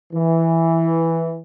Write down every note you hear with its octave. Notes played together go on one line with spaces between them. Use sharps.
E3